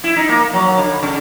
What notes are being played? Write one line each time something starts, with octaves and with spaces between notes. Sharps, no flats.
E4
D#4
A#3
F#3
D3
C#3